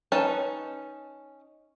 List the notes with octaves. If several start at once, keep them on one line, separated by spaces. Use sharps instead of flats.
C#4 D#4 B4 A5